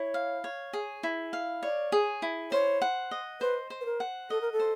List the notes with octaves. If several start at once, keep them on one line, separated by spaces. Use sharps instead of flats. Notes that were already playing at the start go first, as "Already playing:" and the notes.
Already playing: E4 C#5
F5
C#5
G#4
E4
F5
C#5 D5
G#4
E4
C5 C#5
F#5
D#5
B4 C5
C5
B4
A#4
F#5
A4 D#5
A#4
A4
C5